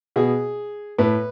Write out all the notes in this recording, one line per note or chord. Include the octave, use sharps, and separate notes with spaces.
B2 G#4
A2 B4